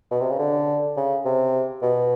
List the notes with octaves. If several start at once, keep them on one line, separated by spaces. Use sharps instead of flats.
B2
C3
C#3
D3
C#3
C3
B2